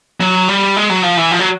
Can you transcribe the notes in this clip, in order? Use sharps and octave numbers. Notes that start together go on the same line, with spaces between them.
F#3
G3
G#3
F#3
F3
E3
F3
F#3